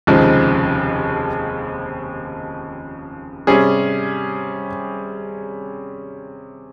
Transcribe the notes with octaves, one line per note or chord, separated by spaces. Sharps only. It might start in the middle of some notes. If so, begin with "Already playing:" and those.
F1 D#2 C#3 F3 G#3
C3 G3 C#4 G#4